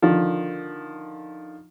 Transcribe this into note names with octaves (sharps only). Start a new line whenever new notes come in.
D3 D#3 F3